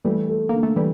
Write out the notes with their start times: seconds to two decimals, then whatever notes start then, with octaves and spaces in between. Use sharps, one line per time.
0.04 E3 G3 A3
0.28 A4
0.49 D3 A#3
0.63 A3
0.76 E3 G3 A4